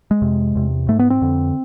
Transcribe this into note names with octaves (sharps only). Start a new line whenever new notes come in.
G#3
F2 C3
E2 C3
G#2 A3
B3
C4
F2 D3